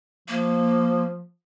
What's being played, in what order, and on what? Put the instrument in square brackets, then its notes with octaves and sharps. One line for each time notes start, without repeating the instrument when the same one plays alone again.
[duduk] F3 [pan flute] A#3